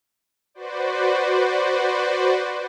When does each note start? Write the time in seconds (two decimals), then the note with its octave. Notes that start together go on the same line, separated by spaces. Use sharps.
0.54 F#4 B4 C5 D5